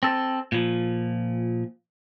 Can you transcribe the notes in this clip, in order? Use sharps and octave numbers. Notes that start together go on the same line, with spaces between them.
C4 A4
A#2 F3